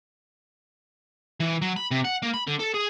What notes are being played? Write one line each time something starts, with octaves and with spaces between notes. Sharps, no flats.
E3
F#3
B5
C3
F#5
A#3
B5
D3
A4
G#4